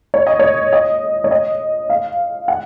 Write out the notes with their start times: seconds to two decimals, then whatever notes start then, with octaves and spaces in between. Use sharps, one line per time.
0.14 C#5
0.27 D#5
0.39 C#5
0.73 D#5
1.24 C#5
1.31 D#5
1.90 F5
2.48 F#5